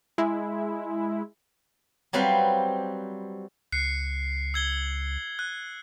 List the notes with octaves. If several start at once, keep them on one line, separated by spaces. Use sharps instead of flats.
G#3 E4
F#3 G3 C4 B4 F5
C#2 F#6 C7 C#7
E6 G#6 G7
F#6